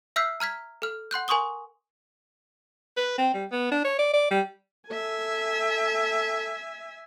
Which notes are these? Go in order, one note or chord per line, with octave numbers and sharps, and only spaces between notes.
E5 E6 F6 G6 B6 C7
A#5 F6 G#6 B6
A4 F6
F#5 C6 F#6 G6
A#4 G#5 C6 C#6 D#6 G7
B4
C4
G3
B3
D4
C#5
D5
D5
G3
A4 E5 G#5